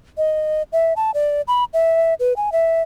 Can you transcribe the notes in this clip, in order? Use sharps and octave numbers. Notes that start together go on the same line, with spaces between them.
D#5
E5
A5
D5
B5
E5
B4
G#5
E5